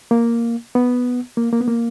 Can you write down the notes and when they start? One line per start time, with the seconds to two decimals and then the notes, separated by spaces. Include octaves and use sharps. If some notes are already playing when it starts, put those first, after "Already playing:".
0.11 A#3
0.75 B3
1.37 A#3
1.53 A#3
1.61 B3
1.68 A#3